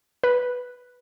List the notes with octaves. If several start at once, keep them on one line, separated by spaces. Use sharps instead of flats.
B4